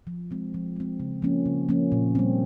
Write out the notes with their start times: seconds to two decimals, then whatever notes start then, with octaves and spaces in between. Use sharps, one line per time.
0.07 F3
0.31 G#3 C4
0.54 F3
0.76 G#3 C4
1.00 C#3
1.22 F3 A#3 C#4
1.46 C#3
1.69 F3 A#3 C#4
1.92 A#2
2.15 G3 C4